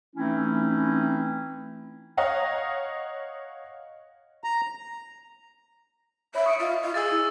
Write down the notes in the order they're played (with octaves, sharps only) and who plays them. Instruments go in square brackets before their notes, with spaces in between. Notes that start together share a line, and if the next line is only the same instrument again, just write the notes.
[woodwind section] E3 A3 C4 C#4 D#4 E4
[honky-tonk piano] C#5 D#5 F5 F#5 A#5
[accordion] A#5
[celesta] C#5 B5 [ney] E5
[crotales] C#6 [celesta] D#6 C#7 D7
[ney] F4 [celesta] D#5 E5
[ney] F4 [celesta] D#5
[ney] G#4 [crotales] E6 A6
[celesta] E4